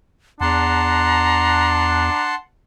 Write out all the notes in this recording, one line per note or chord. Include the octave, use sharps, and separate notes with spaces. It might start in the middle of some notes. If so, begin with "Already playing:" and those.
E2 D4 F#5 A5 A#5 C6